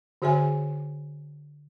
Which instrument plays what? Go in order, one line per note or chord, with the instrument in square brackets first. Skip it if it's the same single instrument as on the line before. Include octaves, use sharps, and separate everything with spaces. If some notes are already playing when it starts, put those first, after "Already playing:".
[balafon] D3 F#4 G#4 C#5 E5 G#5